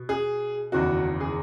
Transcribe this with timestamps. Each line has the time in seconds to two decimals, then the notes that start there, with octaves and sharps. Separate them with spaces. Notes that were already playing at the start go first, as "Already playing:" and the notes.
Already playing: B2
0.09 G#4
0.72 F#1 E2 D#3 F#4
1.20 G#4